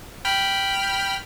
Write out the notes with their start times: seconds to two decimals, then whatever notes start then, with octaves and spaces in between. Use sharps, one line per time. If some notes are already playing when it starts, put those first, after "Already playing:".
0.25 G5 B5 F6